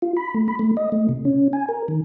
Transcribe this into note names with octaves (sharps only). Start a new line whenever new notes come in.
F4
B5
A3
B5
A3
D#5
A3
C3
C#4
G#5
A#4
D#3